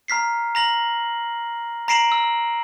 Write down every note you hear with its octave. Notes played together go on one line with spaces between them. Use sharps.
A#5 F6 B6 C7
A#5 A#6 F#7
A#5 A#6 C7 D7 E7 F#7
E6